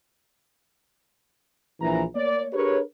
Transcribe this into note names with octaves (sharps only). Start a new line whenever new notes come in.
A#1 E3 A#5
A#3 C#5 D5
D4 G4 G#4 A#4 B4 C#5